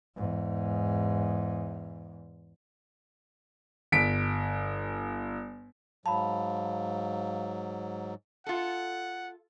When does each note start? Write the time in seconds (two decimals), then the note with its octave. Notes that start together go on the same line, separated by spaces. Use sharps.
0.16 E2 G#2
3.92 G1 B6 D7
6.06 G#2 F#3 F5 A5 B5
8.47 F4 A4 F#5